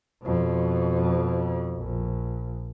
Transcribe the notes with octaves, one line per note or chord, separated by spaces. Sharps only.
F2 B2
A#1